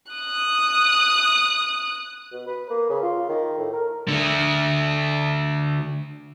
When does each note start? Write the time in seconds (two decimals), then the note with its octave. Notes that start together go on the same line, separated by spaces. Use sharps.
0.12 D#6 F#6
2.33 B2
2.47 B4
2.70 A#3
2.90 C#3
3.02 F4
3.29 D#3
3.58 A2
3.73 A#4
4.08 D3 A3